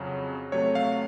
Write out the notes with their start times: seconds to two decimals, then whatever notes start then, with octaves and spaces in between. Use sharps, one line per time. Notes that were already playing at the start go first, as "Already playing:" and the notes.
Already playing: F2 C#3 F#3
0.52 C3 F#3 A3 C#5
0.75 F5